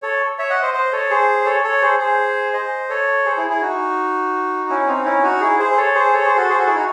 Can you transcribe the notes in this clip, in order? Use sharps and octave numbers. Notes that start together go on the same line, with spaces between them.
A4 C#5
C#5 E5
D#5 F#5
C5 D#5
C5 D#5
A4 C#5
G#4 C5
A4 C#5
A4 C#5
G#4 C5
G#4 C5
C5 D#5
A4 C#5
G#4 C5
E4 G#4
E4 G#4
D#4 F#4
C#4 E4
C4 D#4
C#4 E4
D#4 F#4
E4 G#4
G#4 C5
C5
A4 C#5
G#4 C5
A4 C#5
G#4 C5
F#4 A4
G#4 C5
F#4 A4
E4 G#4
D#4 F#4